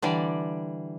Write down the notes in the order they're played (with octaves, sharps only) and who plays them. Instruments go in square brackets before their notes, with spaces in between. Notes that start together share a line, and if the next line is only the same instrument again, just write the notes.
[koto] D3 E3 G3 D5